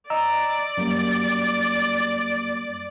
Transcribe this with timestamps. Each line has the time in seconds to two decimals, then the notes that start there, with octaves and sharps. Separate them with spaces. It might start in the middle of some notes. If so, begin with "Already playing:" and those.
0.10 D5 D#5 A#5 E6
0.77 F#2 G3 A#3